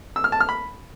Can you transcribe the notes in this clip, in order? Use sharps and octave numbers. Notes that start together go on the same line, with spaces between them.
E6
F6
A5
F6
B5